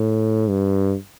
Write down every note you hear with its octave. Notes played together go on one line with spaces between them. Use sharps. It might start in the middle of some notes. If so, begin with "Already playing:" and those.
Already playing: A2
G2